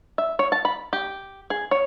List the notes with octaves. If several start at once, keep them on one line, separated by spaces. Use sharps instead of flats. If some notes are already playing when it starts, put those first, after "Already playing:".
E5
C#5
A5
B5
G4
G#4
C#5